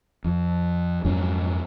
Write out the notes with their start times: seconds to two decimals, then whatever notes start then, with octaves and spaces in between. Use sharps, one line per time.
0.24 F2
1.05 F2 G#2 F#3 C#4